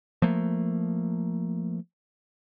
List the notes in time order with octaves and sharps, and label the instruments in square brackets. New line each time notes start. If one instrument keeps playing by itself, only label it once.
[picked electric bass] F3 A3 A#3